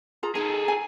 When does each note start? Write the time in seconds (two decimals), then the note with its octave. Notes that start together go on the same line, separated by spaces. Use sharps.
0.23 F4 G#4 A#5
0.35 D#4 G#4 A4 A#5
0.68 G#5